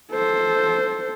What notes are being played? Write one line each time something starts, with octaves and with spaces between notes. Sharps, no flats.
A4 C5